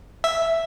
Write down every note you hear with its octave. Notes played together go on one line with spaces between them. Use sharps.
E5